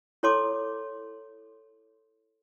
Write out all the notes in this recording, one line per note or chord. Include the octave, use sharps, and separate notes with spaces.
E4 A4 C#5 A5 C6 D6